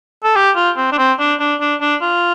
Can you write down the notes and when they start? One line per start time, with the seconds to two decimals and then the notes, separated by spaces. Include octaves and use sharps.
0.24 A4
0.36 G4
0.56 F4
0.77 C4
0.92 D4
0.98 C4
1.19 D4
1.40 D4
1.60 D4
1.81 D4
2.02 F4